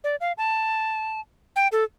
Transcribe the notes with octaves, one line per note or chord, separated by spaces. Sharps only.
D5
F5
A5
G5
A4